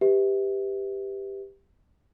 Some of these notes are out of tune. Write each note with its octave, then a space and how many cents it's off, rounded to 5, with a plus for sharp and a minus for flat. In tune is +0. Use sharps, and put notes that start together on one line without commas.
G4 +10 B4 +0 E5 -35